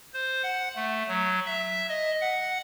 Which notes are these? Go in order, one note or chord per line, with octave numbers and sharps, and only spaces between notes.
C5
F#5
A3
F#3
E5
D#5
F#5